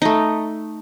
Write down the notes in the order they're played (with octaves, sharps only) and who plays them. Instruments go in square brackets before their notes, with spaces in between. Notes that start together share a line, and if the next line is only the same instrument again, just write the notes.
[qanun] A3 D#4